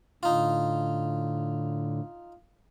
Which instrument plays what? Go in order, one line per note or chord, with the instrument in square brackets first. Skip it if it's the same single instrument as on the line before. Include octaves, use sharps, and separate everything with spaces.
[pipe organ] A2 D3 [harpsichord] D#4 F4